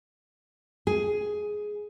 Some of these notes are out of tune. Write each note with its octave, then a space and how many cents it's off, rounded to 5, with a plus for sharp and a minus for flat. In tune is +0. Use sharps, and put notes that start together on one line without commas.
G#4 +10